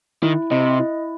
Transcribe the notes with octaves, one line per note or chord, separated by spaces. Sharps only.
D#3 E4
C3 D#5
E4